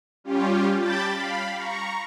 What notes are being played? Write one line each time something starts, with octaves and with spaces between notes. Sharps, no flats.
G3 C#4 F4 G4
G5 A5 B5 D6 G6 A6
F5 B5
A#5 C#6